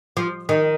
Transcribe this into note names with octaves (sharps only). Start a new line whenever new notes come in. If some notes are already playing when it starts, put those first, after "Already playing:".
F3
D#3